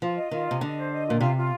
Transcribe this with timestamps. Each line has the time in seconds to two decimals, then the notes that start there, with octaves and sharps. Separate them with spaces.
0.02 F3 F4
0.16 D#5
0.31 D#3 F4
0.47 C3 D#5
0.61 D3 D#5
0.76 C5
0.91 D#5
1.07 A#2 F4
1.21 C3 F4
1.36 F4